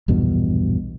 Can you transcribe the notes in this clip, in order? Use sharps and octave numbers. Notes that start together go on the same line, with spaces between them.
A#1 E2 G2 B2